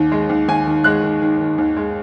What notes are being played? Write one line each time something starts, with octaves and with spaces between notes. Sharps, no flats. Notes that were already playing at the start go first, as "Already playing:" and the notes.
Already playing: D#2 D#3
G#3
D#2
D#2 G#5
D#3
G#3 F#6
D#3
D#3
D#3
D#2
G#3